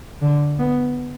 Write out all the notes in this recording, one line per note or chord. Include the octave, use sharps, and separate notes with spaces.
D3
B3